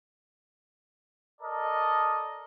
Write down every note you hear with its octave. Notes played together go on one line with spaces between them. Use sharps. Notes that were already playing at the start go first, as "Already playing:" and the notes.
A4 A#4 D5 D#5